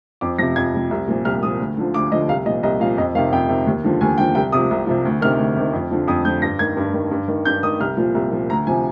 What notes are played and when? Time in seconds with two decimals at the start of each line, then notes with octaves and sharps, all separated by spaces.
0.21 F2 D6
0.38 F3 A#6
0.42 C3
0.56 F2 G#6
0.74 C3 F3
0.91 C2
1.08 A#2 F3
1.25 C2 F6
1.43 A#2 F3 D#6
1.59 D2
1.77 D3 F3
1.94 D2 D6
2.12 D3 F3 D#5
2.29 C2 F5
2.46 A#2 D#5
2.49 F3
2.63 C2 D#5
2.80 A#2 F3 F5
2.97 F2 D#5
3.15 D#3 F5
3.18 C3
3.32 F2 G5
3.49 C3 D#3
3.67 D#2
3.84 D3 F3
4.01 D#2 G#5
4.18 D3 F3 G5
4.35 C2 G5
4.52 C3 F3 D#6
4.71 C2
4.87 C3 F3
5.05 D2
5.21 C3 D#3 F6
5.39 D2
5.56 C3 D#3
5.73 F2
5.91 D3 F3
6.08 F2 D#6
6.25 D3 F3 G6
6.42 G2 A#6
6.59 D#3 G#6
6.77 G2
6.94 D#3
7.11 G2
7.28 D#3
7.45 G2 G6
7.63 D#3 D#6
7.80 C2 F6
7.97 A#2 F3
8.15 C2
8.31 A#2 F3
8.49 D2 A#5
8.67 C3 F3 G#5